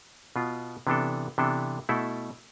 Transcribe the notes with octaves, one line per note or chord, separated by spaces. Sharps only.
B2 B3 F4
C3 E3 B3 D4 A4
C3 E3 B3 D4 A4
B2 A3 E4 A4